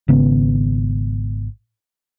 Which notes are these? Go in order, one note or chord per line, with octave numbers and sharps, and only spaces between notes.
G#1 C#3 B3